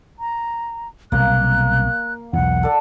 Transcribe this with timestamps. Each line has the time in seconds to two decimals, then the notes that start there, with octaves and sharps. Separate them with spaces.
0.19 A#5
1.12 B1 C3 G3 A#3 F#6
2.33 B1 E2 F#5
2.63 A4 D5